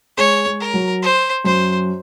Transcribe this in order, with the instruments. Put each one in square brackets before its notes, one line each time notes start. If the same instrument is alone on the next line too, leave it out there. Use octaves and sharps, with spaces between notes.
[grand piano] G#3 [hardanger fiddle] C#5
[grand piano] G#3
[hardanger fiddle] A#4
[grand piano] F#3
[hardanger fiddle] C5
[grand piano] F#2 [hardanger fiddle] C5